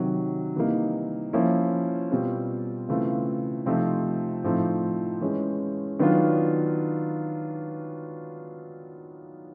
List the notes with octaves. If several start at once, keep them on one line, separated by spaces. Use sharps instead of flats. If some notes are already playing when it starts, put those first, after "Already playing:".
Already playing: C3 D#3 F#3
C3 E3 G3 A#3 D#4
F3 A#3 C#4 E4
B2 G3 C4 F4
C#3 E3 A3 C4 F4
C3 F3 A3 C4 D#4
A2 F3 A3 C4 D#4
E3 G#3 C#4
D#3 F#3 B3 D4 F4